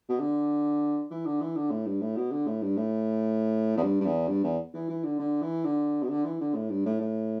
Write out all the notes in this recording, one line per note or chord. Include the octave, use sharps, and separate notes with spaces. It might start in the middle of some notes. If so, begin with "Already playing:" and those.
B2
D3
E3
D3
E3
D3
A2
G2
A2
B2
D3
A2
G2
A2
E2
G2
G2
E2
G2
E2
E3
E3
D3
D3
E3
D3
B2
D3
E3
D3
A2
G2
A2
A2